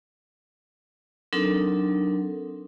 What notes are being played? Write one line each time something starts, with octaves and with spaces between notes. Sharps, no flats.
F#3 C4 D4 D#4 A4 A#4